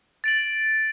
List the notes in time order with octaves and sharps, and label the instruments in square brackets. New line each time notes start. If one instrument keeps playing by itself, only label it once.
[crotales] A6 D7 F#7